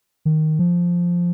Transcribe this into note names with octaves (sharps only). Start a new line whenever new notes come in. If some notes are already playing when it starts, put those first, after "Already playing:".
D#3
F3